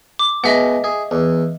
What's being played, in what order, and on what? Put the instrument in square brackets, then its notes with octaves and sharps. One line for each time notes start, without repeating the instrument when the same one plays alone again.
[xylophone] D6
[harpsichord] B2 G#3 [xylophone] D#5 E5 F#5
[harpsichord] G#4
E2